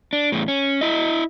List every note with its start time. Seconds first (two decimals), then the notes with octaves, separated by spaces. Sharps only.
0.13 D4
0.32 E2 A2
0.48 C#4
0.81 E4 D#5